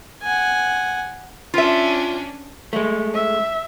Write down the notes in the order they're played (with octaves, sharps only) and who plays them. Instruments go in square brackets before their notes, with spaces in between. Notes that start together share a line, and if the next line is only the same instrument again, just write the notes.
[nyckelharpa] F#5 G#5
[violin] C#4 D4 [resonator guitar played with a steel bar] F4 E5
[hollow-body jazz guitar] G#3 A3
[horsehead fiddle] E5